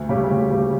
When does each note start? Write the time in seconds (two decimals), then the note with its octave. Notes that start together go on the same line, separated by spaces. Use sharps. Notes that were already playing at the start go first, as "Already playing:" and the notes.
Already playing: D2
0.09 C#3 G3 C#4 G4
0.30 D2
0.51 C#3 G3 C#4 G4